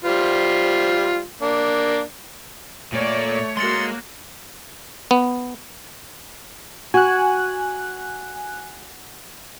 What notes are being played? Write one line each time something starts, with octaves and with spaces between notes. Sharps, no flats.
G3 F4 C5
A#3 D4
A#2 A3 A#3 C#5 D5
G#3 A#3 F#4 C6 A6 C#7
B3
F#4 G#5 F#6